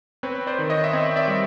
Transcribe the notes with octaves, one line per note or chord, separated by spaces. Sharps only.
C4 B4 C#5
C5 D5
D#3
C#5 D#5
E5
C4 C#5 D#5
D5 E5
G3